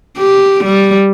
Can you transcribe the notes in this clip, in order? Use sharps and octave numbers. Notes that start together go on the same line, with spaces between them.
G4
G3